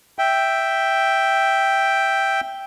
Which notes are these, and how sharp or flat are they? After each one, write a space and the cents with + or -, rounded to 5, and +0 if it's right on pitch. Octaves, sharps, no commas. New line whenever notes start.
E5 +0 G5 +0